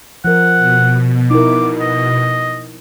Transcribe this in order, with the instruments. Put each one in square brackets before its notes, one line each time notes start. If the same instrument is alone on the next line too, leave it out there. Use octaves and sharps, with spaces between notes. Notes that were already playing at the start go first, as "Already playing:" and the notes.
[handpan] F3 A#4 [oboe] F#5
[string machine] B2
[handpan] D#4 E4 A#4 [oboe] D6
[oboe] D#5